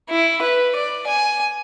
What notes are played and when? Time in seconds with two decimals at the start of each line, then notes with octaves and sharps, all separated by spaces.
0.10 E4
0.42 B4
0.76 D5
1.08 G#5